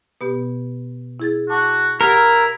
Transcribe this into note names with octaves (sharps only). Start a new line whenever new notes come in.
B2 B3 G4
E4 G#4 A6
F#4 A5 D6
E4 G4 A#4 F#5